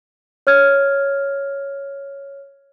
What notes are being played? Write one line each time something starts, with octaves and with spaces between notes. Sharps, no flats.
C#5 F6 G#6